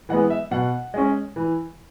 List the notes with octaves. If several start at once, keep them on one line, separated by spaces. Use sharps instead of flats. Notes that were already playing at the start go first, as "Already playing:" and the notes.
E3 G#3 B3 F#5
E5
B2 F#5
G#3 C#4
E3